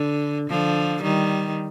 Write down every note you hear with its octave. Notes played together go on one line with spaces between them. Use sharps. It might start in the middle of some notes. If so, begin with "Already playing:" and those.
Already playing: D3
D3 F3
D#3 G3